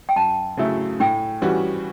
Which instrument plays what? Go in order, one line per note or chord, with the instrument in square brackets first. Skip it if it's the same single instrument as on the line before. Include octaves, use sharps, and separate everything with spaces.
[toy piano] G5
[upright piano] F#2 [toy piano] A5
[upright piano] C#3 F#3 A3 E4
[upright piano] A2 [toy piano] G5
[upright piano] E3 G3 C#4 F#4